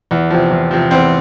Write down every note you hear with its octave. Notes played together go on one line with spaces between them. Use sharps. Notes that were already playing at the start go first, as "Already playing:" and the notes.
E2
C3 F3
E2
C3 F3
E2 C4